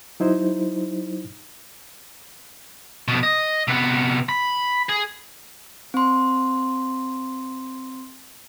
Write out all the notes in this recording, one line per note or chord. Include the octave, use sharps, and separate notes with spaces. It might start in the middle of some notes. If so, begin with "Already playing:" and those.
F#3 D#4 E4 C5
F2 B2
D#5
C3 B3
B5
G#4
C4 C6